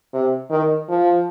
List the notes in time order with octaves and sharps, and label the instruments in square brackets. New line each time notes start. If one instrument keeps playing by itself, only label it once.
[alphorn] C3
D#3
F3